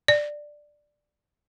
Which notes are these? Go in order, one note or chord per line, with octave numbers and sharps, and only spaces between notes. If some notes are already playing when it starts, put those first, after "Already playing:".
D5